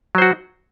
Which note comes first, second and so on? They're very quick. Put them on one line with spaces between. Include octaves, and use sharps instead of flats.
F#3 C5 F#4